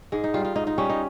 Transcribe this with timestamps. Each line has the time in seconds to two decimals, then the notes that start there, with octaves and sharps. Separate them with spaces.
0.12 G#2 G#3
0.24 D#4
0.34 G3 F4
0.45 F4
0.55 G#2 D#4
0.67 D#4
0.78 G3 C#4
0.90 D#4